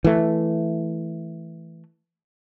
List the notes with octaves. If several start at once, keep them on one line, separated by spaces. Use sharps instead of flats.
E3 A3